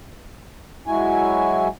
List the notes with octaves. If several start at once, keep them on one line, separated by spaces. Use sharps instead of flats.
F#3 G#3 E4 F#4 G#5